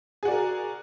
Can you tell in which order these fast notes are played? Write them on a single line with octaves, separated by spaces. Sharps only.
G#4 F#4 D5 A#4